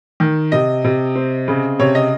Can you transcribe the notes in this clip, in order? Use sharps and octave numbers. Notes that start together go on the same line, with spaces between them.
D#3
C3 D#5
C3
C4
C#3
C3 C#5
D#5